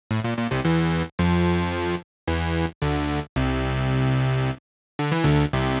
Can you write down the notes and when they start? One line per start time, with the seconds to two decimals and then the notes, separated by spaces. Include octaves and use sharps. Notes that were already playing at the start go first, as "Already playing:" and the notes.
0.11 A2
0.24 A#2
0.38 A#2
0.51 C2 C3
0.65 E2 E3
1.19 F2 F3
2.28 E2 E3
2.82 D2 D3
3.36 C2 C3
4.99 D3
5.12 E3
5.24 D2 D3
5.53 C2 C3